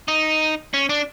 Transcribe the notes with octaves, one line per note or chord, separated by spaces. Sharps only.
D#4
C#4
D4